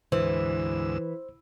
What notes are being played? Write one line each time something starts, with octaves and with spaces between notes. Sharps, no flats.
D2 G#2 E3 C5 E6